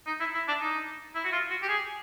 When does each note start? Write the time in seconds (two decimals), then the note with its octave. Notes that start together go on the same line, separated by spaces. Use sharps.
0.07 D#4
0.20 E4
0.34 E4
0.48 D4
0.61 D#4
1.15 E4
1.24 F#4
1.32 F4
1.50 F#4
1.62 G4
1.69 G#4